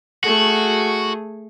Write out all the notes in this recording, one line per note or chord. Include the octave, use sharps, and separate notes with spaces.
A3 F#4 G#4